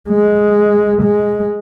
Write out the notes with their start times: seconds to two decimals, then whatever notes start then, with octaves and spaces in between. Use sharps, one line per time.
0.09 G#3
1.02 G#3